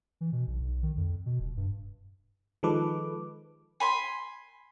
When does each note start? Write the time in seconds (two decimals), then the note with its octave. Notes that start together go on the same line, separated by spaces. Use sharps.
0.21 E3
0.32 B2
0.47 B1
0.60 B1
0.83 D#3
0.97 F2
1.26 B2
1.40 D#1
1.57 G2
2.63 D#3 F3 G#3 A4 B4 D6
3.80 G#5 B5 C6